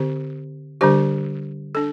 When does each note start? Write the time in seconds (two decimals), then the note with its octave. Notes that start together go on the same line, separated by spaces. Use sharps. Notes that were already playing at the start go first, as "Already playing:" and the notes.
Already playing: D3 C4 G4 C5
0.81 D3 G3 D4 G4 C5
1.75 D4 A4